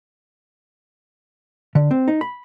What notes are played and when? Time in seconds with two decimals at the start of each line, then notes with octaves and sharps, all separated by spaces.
1.75 D3
1.91 C4
2.08 D#4
2.21 B5